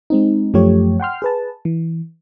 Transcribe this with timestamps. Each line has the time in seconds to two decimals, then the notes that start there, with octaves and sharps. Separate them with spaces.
0.10 G#3 C4 D#4
0.54 F#2 F3 A3 G4 C#5
1.00 F#5 G5 C6 F6
1.22 G#4 B4 A5
1.65 E3